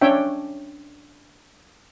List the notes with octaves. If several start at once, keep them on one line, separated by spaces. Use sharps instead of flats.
C#4 D4 C#5 E5 G5